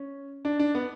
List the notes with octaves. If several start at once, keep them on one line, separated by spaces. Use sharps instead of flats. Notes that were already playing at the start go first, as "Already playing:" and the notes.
Already playing: C#4
D4
D4
B3